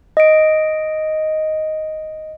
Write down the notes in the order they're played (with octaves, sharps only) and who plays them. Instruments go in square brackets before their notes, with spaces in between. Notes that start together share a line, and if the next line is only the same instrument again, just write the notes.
[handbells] D#5 D7